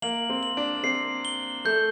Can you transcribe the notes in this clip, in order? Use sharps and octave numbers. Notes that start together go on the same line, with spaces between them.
A#3 F#7
C4
F#7
D4
C4 C7
G7
A3 G6